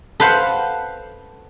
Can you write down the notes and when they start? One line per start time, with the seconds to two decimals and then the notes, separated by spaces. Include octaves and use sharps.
0.20 A4 B4 C5 F5 F#5